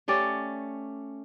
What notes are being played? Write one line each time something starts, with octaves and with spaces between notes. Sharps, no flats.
A3 C#4 G4 D5